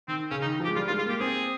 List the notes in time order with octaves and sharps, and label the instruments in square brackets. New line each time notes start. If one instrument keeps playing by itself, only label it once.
[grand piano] D#3 [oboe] C4
[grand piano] C#3 [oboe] C#4
[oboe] D#4
[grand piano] D#3
[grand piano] F3 [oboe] G4
[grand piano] G#3
[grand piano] G3 [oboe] F4
[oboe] F4
[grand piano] G#3
[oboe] F4
[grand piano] A#3 [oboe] G4
[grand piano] C4 [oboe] G#4